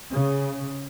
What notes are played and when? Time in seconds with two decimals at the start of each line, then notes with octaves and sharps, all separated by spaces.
0.10 C#3